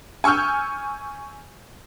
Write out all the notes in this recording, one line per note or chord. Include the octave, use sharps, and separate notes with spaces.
G#5 C#6 E6 F6 G6